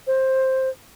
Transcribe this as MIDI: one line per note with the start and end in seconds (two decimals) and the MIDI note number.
0.07 0.70 72